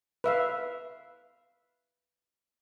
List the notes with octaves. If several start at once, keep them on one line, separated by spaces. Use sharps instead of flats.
B4 E5 F5